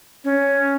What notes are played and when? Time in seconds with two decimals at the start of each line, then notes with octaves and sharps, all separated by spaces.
0.24 C#4